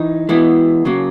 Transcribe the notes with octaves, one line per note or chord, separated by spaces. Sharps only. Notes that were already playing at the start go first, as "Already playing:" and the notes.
Already playing: E3 D#4
E3 G#3 B3 E4
C#3 F#3 A#3